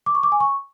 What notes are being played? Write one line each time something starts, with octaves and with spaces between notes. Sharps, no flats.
D6
C#6
D6
G#5
C#6